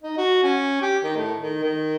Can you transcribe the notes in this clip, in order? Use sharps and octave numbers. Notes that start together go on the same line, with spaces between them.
D#4
F#4
C#4
G4
D#3
A2
D#3
D#3